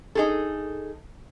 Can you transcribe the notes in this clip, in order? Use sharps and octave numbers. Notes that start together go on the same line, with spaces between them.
D#4 G#4 A4